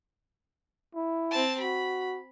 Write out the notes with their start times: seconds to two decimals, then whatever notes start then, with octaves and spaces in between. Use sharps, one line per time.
0.95 E4
1.31 C4 A5
1.60 F#4 B5